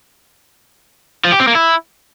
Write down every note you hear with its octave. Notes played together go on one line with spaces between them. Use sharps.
F3
G4
C4
A#3
E4